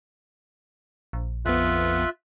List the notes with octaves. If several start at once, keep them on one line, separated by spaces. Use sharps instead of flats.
A#1
F2 B3 F4 E5 F#6